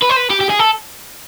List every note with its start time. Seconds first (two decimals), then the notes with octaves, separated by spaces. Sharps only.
0.02 B4
0.09 C5
0.16 B4
0.30 G4
0.41 G4
0.50 G#4
0.59 A4